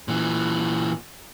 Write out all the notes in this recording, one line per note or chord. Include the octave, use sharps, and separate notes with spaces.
A#2 E3